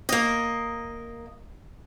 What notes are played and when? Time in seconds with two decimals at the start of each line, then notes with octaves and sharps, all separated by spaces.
0.09 A#3 D#5